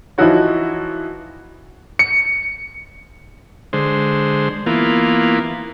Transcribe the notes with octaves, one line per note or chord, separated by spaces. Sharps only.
E3 F3 D#4 E4 F#4 C#5
C#7
D3 G#3 C5
E3 A#3 B3 F4